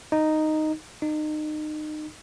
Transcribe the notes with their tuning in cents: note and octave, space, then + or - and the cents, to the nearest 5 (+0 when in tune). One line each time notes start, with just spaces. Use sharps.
D#4 -5
D#4 -30